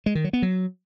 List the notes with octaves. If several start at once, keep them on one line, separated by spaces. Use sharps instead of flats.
G#3
D#3
F#3
B3
F#3